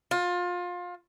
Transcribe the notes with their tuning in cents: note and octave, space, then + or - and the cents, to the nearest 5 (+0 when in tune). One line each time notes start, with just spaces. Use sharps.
F4 +25